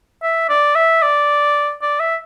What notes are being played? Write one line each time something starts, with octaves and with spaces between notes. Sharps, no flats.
E5
D5
E5
D5
D5
E5